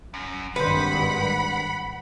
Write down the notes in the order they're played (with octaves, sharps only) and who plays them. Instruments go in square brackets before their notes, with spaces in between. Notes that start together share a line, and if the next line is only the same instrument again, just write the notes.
[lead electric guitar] F#2
[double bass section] G#1 G2 D#3 [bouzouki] B4 C5 [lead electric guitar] F#5 [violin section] B5